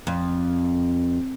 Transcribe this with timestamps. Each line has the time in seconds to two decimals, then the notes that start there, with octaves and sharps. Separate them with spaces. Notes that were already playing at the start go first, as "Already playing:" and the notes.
0.07 F2